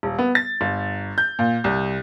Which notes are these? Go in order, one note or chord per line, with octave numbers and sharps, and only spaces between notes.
D#1
B3
A6
G1
G6
A#2
C2